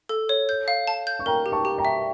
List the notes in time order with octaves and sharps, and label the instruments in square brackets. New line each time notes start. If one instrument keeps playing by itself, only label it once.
[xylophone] A4
C#5
G6
F5
A5
G6
[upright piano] C#6
[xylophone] A#4 [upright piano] G5 A#5
[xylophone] G4
[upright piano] A5 C#6
[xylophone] G4
[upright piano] G5 A#5
[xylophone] E5